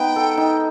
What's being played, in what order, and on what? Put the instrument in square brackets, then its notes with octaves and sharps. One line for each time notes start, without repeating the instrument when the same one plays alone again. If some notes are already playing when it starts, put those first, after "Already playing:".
Already playing: [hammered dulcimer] B3 D#4 [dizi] G5
[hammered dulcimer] A4
D#4